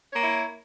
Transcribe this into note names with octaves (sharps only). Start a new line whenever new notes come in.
A#3 E4 C#5